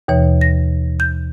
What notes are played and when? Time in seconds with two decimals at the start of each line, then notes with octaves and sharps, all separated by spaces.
0.08 D#2 B2 E3 C#5
0.41 A#6
1.00 G6